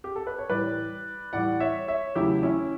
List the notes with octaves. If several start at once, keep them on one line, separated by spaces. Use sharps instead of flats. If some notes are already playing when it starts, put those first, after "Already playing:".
G4
A4
B4
C#5
A2 E3 G3 B4 D5
A2 E3 G3 D5 F#5
C#5 E5
C#5 E5
E2 C#3 F#3 A3 E4 G4
C#4 E4